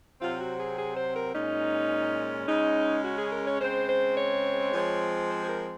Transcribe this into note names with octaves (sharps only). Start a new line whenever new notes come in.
C3 F#3 C4 F4
F#4
G#4
G#4
C5
A#4
A#2 G#3 C#4 D#4
C#3 G#3 C#4 D#4
F#4
G#4
A#4
C#5
C#3 G#3 C4 C5
C5
C#5
F3 G#3 C4
C5
G#4
A#4